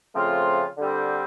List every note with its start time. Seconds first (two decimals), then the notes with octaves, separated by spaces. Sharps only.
0.13 C#3 F3 A3 C4 F4
0.77 D3 G3 C4